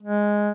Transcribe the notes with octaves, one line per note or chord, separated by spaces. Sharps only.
G#3